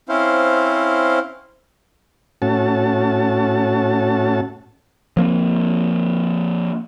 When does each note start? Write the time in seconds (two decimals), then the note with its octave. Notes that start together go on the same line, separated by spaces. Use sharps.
0.09 C4 C#4 E4 C5 F5
2.42 A2 C#4 F#4 A5
5.17 F3 A#3 C4